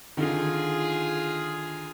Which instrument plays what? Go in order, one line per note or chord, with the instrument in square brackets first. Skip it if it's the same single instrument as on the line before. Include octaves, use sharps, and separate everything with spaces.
[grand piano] D3 D#3 [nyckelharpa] F4 G#4